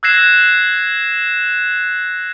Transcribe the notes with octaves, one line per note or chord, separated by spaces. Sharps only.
E6 F#6 G#6 A#6 C7 E7